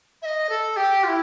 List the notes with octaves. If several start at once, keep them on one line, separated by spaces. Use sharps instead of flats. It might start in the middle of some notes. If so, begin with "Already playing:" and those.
E5
D#5
A4
G4
F4
E4